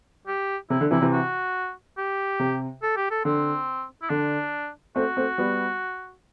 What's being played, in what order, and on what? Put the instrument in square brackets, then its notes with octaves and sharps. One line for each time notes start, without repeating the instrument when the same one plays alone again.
[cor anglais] G4
[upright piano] C3 [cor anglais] E4
[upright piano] D3
[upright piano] C3 E3 [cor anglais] E4
[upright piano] C3 E3
[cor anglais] F#4
G4
[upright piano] C3
[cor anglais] A4
G4
A4
[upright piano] D3 [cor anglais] C4
[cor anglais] E4
[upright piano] D3 [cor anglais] D4
[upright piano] A3 C4 [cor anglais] F#4
[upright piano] A3 C4
G3 B3